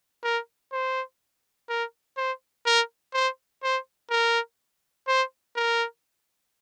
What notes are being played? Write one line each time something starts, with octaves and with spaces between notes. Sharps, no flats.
A#4
C5
A#4
C5
A#4
C5
C5
A#4
C5
A#4